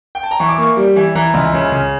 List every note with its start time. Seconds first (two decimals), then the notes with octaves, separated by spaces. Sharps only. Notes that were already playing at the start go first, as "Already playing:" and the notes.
0.15 G5
0.23 A5
0.31 A#5
0.39 E3 C#6
0.49 D6
0.58 A#3 C#6
0.77 G3
0.96 E3
1.15 E3 A#5
1.34 C#2
1.53 C#3
1.72 C#3